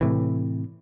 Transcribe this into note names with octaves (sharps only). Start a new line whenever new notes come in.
A2 C3 E3